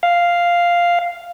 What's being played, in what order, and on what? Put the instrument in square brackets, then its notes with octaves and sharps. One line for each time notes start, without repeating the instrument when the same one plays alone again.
[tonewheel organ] F5